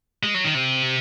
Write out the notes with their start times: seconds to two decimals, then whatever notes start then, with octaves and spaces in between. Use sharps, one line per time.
0.23 G#3
0.34 F#3
0.44 D#3
0.55 C3